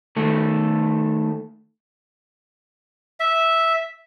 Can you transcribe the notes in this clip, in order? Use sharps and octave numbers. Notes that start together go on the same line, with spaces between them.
D#3 A3 A4
E5